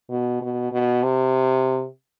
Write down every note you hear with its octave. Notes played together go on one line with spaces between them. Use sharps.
B2
B2
B2
C3